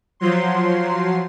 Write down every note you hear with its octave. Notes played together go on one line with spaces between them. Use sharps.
F3 F#3 C6